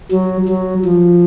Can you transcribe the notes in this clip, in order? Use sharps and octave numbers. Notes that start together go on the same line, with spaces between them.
F#3
F#3
F3